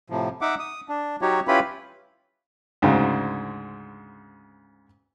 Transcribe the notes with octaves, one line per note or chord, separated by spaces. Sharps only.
A2 C3 F3
D#4 E5 F#5 D6
D#6
D4
F#3 D#4 F#4 G4 C#5
C#4 E4 F4 G4 B4 B5
D2 G#2 C#3